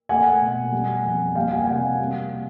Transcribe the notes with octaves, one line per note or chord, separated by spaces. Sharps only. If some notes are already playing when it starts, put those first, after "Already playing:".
A3 F#5 G#5
B2
G3
F2
G3 F5 G5
F#5 G#5
C3 F#5 G#5
F5 G5
G3